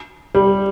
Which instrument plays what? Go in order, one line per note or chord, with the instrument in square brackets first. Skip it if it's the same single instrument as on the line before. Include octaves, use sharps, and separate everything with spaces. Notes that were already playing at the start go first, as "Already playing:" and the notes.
[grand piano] G3